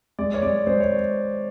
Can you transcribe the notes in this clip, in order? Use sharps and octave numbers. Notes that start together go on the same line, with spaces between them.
G#3 D5
C#5
G#3 D5
G#3 C5
C#5